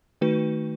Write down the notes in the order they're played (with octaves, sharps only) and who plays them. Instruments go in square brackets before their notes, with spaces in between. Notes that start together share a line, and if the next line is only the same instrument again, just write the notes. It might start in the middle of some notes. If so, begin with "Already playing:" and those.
[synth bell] D#3 A3 D#4 F#4 B4